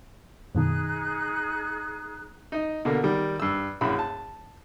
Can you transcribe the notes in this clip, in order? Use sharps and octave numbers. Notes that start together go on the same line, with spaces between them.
F#2 B2 D#3 D#4 G#4 F#6
D#4 D#5
B2 D3 A#3
D#3 G3
G2 E6
A#1 F#2 E4 B5
A5